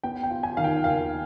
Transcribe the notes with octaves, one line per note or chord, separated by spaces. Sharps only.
B3 G5
G5
F4
G#5
D#3 F5
G5
D#2 F5